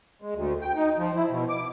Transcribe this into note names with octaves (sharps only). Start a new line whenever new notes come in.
G#3
D2
G5
D#4
F3
E4
B2
D6